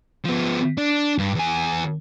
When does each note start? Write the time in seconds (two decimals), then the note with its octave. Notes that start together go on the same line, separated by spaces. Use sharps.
0.24 F3 B3
0.77 D4
1.18 G2
1.35 E2 G#5